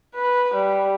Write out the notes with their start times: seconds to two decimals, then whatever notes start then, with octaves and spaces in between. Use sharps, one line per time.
0.15 B4
0.54 G3